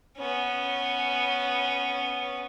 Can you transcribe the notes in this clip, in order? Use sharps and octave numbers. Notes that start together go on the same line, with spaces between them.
B3 C#4